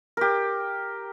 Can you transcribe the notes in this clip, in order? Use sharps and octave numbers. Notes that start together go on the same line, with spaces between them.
G4 A#4